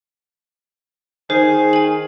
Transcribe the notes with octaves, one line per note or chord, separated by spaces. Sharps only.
D#3 G#4 C5
G#5 F#7